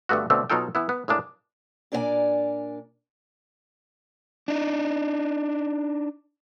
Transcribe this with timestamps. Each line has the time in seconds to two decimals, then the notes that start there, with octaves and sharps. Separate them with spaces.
0.09 G2 D3 A3 B3 F#4
0.30 B2 D3 A3 C4
0.50 B2 F#3 D#4 F4 A4 G5
0.75 E3 B3 E4
0.89 B3
1.08 A2 G#3 A#3 D4
1.92 A#2 D4 A#4 C#5 D5 G#5
4.48 D4 D#4